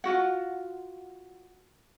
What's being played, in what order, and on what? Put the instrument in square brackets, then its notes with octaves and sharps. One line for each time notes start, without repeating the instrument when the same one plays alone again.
[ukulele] F4 F#4 F#5